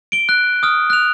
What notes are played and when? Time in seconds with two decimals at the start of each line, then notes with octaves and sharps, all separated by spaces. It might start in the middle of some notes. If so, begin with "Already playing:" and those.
0.12 D7 G7
0.29 F#6
0.63 D#6 F6
0.90 F#6 F7